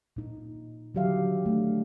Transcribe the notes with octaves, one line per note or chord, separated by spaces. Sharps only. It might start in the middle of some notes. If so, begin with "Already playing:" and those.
A#2 D#4
D3 D#3 F#3 G4 E5 F5
A3 D4